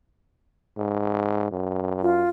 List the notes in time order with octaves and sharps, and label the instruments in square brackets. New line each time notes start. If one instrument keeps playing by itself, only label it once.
[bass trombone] G#2
F#2
[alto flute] F4